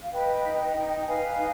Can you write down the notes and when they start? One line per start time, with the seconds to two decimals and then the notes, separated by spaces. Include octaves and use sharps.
0.02 F5
0.13 B4 D#5 G5
0.44 D#4
0.76 D#4
0.98 G5
1.06 B4 F5 G#5
1.38 D#4